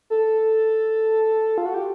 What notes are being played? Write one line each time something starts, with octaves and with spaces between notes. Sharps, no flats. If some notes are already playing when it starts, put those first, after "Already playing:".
A4
F4
F#4
G4